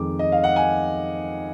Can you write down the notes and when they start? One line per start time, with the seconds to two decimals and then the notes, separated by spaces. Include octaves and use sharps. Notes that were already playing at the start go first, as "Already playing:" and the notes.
Already playing: F2 D#3 G#3 D6
0.19 D#5
0.32 F5
0.44 F#5
0.56 G#5